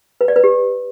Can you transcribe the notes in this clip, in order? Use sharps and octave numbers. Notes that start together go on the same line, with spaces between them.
B4
D5
B4
G4